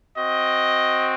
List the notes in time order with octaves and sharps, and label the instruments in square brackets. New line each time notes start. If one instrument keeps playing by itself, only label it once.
[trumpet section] C4 F#4 D#5